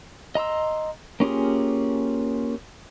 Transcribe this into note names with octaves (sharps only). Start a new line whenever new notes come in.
D#5 A#5 C6 E6
A#3 C#4 F4 G4 G#4